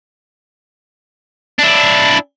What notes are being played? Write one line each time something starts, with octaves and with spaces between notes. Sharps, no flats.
D4 E4